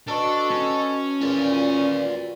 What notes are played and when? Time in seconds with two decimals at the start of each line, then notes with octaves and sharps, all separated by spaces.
0.08 D4 F#4 A4 B4 D#5 A5 C#6
0.51 C#4
1.21 E2 A#2 F4 F#4 D5